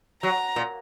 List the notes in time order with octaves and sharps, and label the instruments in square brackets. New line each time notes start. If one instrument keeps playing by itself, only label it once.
[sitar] F#3 [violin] A#5
[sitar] A#2